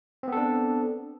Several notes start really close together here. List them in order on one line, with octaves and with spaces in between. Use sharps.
C4 B3 A4 D4